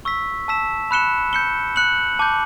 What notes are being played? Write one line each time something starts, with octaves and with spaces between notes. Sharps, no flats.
C#6 E6 B6
A5 E6 B6 E7
B5 F#6 C#7 E7 G7
G6 C#7 G7
F#6 C#7 F#7
A5 D6 G6